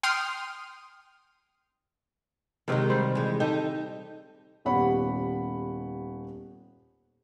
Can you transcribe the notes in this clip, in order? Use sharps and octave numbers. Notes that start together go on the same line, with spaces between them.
G5 C6 D#6 F6
C3 D#3 F#3 G#3 D#4
G3 C5
E3 G#3
D#4 G4 A4
D#1 B3 G4 C#5 F#5 B5